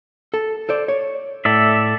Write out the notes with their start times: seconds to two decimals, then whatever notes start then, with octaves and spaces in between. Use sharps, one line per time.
0.34 A4
0.69 A4 C5 D5
0.88 C#5
1.45 A2 A4 D5 E5